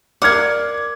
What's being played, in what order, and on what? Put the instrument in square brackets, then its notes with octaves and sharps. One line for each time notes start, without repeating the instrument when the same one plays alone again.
[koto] A#3 F#5 [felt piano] D5 F6 G#6 [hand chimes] D6